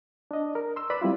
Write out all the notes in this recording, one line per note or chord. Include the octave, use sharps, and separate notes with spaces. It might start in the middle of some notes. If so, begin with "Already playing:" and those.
D4 D#5
A#4
C6 E6
B4 D5 B5
G3 C4 E4 F4